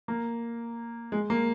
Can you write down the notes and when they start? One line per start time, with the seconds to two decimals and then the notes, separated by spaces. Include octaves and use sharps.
0.08 A#3
1.12 G#3
1.30 A#3